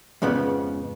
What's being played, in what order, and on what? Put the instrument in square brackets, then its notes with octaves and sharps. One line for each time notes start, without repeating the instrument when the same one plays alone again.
[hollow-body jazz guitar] F2 G#2 C#3 F3 B3